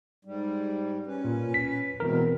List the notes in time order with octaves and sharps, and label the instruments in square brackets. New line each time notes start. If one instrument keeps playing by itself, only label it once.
[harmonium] G#2 G3
C#4 B4
[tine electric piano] A#2
B6
[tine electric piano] B2 E3 A#4 [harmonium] G#3 C4